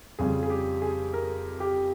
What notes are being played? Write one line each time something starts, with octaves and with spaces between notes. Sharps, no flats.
F2 C#3 G3 G#4
G#4
G4
G#4
A#4
G4